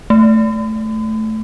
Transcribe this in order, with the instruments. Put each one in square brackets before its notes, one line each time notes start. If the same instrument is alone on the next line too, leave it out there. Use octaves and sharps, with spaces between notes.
[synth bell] A3